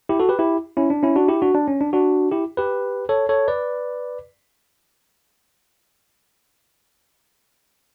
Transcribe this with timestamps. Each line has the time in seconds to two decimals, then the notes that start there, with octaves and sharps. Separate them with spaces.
0.09 E4 G4
0.19 F#4 A4
0.29 G4 B4
0.39 E4 G4
0.77 C#4 E4
0.90 D4
1.03 C#4 E4
1.16 D4 F#4
1.28 E4 G4
1.42 D4 F#4
1.54 D4
1.68 C#4
1.81 D4
1.93 D4 F#4
2.32 E4 G4
2.57 G4 B4
3.09 A4 C#5
3.29 A4 C#5
3.48 B4 D5